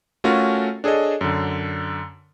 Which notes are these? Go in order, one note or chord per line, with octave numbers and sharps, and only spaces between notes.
A3 C#4 F4 F#4 A4 A#4
D4 G#4 A4 C#5 D#5
F#2 D3